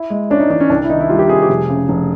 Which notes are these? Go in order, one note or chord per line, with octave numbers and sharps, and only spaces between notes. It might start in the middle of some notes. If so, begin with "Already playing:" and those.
Already playing: E4
G#3
C#4 D4
D#4
E3 D4
C#4
C2 D4
E4
D#3 D#4
E4
G3 F4
G4
C3 G#4
G4
F1 G#4
C#3
F1